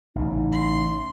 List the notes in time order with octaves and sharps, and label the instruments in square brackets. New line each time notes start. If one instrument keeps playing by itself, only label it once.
[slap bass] A1 C#3 [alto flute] D#4
[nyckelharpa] C6